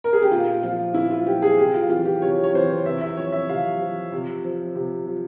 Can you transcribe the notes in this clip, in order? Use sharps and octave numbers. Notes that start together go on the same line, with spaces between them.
A#4
G#4
G4
A#2 F4
F3 F4
A#2 E4
F4
F3 G4
G#4
C3 G4
F4
E3 F4
G4
C3 C#5
C#5
E3 C5
C#5
C3 E5
E5
F3 C#5
E5
C3 F5
F3
C3
F3
C3
F3